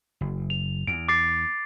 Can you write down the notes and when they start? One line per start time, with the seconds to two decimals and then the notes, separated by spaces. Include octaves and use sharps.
0.21 F#1
0.50 F7
0.87 E2 D7
1.08 D6 A6 C7